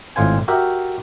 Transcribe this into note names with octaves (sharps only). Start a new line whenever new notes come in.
G#1 A2 F4 C5 G#5
F#4 G4 A#4 E5